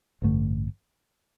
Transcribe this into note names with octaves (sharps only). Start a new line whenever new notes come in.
A1 G2 D3 A3